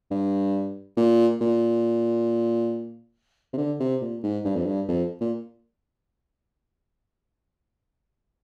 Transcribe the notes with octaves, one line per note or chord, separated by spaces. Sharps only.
G2
A#2
A#2
C3
D3
C3
A#2
G#2
G2
F2
G2
F2
A#2